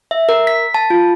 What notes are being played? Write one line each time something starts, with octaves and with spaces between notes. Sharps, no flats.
E5
A#4
B6
A5
F4